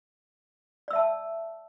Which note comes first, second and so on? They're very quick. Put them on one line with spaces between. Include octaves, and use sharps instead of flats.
D5 E6 E5 A5